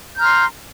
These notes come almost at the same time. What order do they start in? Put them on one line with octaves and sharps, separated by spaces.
G6 A#5 F6 C6